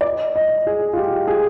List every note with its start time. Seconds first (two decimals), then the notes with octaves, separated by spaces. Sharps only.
0.01 D5
0.05 D#5
0.36 D#5
0.67 G#4
0.93 F4
0.98 G4
1.28 G#4